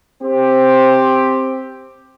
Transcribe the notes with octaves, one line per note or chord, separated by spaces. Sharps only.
C4 G4